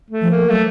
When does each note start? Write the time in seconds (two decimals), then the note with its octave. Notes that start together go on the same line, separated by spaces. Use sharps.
0.11 A3
0.22 F3
0.31 A#3
0.50 F#3 A3